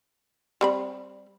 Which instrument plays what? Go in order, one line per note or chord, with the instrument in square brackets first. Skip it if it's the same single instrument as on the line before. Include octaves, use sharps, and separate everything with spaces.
[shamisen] G3 C4 B5